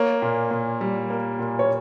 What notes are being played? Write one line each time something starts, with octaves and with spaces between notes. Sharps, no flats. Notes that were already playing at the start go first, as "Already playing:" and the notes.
Already playing: A#3 C#5
A#2
A#2
G3
A#3
A#2
C#5